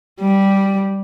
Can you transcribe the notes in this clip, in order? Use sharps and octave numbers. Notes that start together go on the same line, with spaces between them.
G3